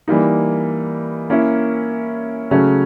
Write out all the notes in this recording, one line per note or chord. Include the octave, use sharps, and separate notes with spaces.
E3 G3 A#3 D#4
A#3 C#4 E4
C#3 F#3 A3 C#4